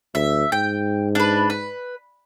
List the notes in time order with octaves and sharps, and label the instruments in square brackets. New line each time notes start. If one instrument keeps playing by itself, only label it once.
[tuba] D2 [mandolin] E5
[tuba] G#2 [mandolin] G5
[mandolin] D4 B4
B4